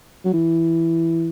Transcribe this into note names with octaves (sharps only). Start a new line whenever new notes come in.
F#3
E3